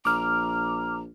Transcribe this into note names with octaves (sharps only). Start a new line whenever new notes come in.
A#1 A#5 D6 F6